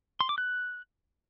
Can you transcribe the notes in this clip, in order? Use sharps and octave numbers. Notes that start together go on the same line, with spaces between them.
C6
D6
F#6